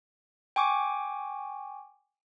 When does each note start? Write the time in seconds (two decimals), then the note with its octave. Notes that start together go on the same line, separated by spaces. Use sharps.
0.56 G5 G#5 C#6 D6